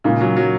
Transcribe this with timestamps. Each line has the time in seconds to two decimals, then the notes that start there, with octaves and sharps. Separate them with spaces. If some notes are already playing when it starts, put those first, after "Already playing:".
0.04 A#2 C#3 G#3 D#4
0.20 F#3
0.36 F#3